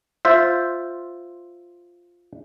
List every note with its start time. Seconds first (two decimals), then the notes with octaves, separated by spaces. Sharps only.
0.25 F4 C5 E5